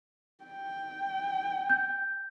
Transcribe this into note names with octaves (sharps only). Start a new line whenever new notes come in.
G5
G6